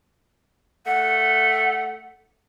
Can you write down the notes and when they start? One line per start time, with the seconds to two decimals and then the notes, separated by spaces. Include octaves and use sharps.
0.86 A3 F#5